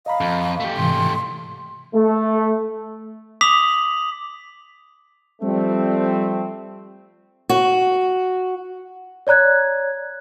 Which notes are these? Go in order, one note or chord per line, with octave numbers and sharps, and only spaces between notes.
D#5 F5 A#5 B5
F2
A3 G4
G#2 C3 E3 C6
A3
D6 D#6 B6 F7 F#7
F3 G3 A3 C4
F#4
C#5 D5 A#5 F#6 G#6